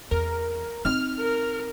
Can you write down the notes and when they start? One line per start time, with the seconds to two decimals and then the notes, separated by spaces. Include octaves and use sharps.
0.11 E2 A#4
0.85 C4 D#4 F6
1.20 A#4